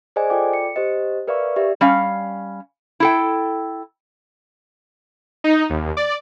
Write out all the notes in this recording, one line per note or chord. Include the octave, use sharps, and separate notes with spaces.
G#4 C5 D5 D#5 G#5
F4 A4 D5 G5 D6
C#7
G4 C5 D#5
A#4 B4 D5 E5 F5 C#6
G4 D5 E5
G3 C#4 F5
E4 A4 G5
D#4
D#2
D5